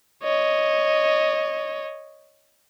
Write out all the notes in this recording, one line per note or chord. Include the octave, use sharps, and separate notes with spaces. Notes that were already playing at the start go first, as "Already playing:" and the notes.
C#5 D#5